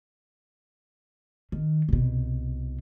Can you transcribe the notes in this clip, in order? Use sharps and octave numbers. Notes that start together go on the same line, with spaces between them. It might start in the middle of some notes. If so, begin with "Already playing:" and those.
D#3
C2 B2